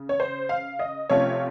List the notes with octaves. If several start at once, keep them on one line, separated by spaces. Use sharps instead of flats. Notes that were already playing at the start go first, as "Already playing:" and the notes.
Already playing: C#3
C#5
C5
F5
D#5
C3 F3 A3 C#4 F4 C#5